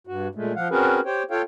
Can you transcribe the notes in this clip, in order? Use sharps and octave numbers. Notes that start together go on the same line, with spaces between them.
G2 F#4
A#2 G#3 A3
F3 F5 F#5
C4 C#4 F#4 G#4 A#4 B4
G4 C5 C#5 G5
F4 A4 C#5 F5 G5